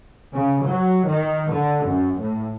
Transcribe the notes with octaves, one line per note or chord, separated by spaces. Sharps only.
C#3
F#3
D#3
D3
F#2
A2